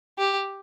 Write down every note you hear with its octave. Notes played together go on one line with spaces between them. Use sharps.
G4